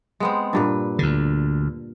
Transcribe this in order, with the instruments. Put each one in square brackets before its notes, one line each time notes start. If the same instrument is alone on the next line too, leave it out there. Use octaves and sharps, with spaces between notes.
[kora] G#3 B3 C4
G2 A#2 B4
[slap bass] D2 D3